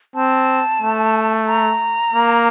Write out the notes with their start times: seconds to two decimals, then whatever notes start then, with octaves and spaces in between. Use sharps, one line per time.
0.15 C4 A5
0.81 A3
1.47 A#5
2.14 A#3